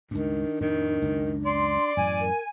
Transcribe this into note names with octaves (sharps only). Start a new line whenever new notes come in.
C#2 G2 D#3 D4
F2 A2 D#3
C#2 F#2
D5 C6
F#2 A2 E3 G#5
A#4